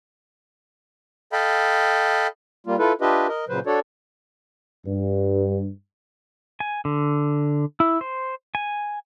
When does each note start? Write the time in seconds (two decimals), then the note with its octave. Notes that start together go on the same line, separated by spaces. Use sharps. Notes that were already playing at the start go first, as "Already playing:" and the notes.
1.33 A4 D#5 F5 G5 B5
2.67 G3 A#3 F4
2.79 E4 F4 A4 B4
3.01 D4 F4 G4 B4 D#5 E5
3.28 A#4 D#5
3.48 A#2 C#3 F#3 B4 C5
3.66 D4 F#4 A4 C#5 D5
4.87 G2
6.60 G#5
6.85 D3
7.80 E4
8.01 C5
8.55 G#5